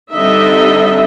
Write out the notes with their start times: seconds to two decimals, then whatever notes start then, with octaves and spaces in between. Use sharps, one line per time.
0.11 D3 G3 C4 D#4 D#5 E5